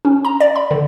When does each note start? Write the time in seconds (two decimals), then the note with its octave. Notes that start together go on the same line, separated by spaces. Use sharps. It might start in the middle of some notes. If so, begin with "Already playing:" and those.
0.05 C#4
0.25 A#5
0.40 D5
0.56 B5
0.71 D3